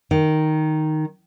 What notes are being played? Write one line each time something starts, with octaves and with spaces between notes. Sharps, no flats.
D#3